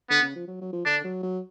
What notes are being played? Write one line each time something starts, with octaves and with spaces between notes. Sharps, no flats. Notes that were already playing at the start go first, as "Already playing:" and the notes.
D3 B3
C#3
F3
F#3
F#3
F3
D3 D4
F#3
F#3